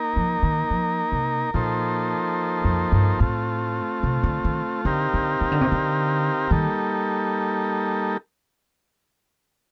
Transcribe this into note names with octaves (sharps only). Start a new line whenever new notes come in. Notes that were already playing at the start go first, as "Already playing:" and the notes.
Already playing: A#3 D#4 A#4
F3
D#3
F3
C3
A#2 F3 A#3 D#4 A4 C5
F2
G2
A2 A3 C4 F4
C3
D3
D#3
D3 C4 D#4 G4 A#4 F5
D3
D#3
D3
C3
D3
D#3 G3 A#3 D#4 A4